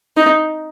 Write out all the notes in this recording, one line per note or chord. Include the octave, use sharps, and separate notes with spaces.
D#4